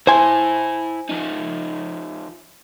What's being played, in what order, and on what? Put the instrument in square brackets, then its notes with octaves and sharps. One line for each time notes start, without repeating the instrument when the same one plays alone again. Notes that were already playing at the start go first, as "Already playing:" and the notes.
[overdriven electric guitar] E4 A5 [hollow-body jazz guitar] C5 G#5
[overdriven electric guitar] F3 D#4